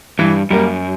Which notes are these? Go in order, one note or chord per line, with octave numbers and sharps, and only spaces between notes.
G2 E3
F#2 G3 A#3